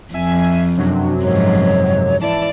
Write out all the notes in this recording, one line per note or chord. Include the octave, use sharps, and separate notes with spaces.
F2 E5 G#5
F#2 C3 F#3 D4
G#2 F3 C#5
E3 D5 A5